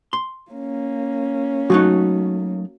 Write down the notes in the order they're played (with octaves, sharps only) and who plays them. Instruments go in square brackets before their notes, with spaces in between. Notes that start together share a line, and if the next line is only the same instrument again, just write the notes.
[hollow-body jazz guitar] C6
[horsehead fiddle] A#3 C#4
[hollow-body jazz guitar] F#3 A3 D#4 [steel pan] F#4